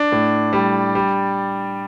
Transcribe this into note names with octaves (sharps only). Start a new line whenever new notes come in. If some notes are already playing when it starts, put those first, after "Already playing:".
Already playing: D4
A2
G3
G3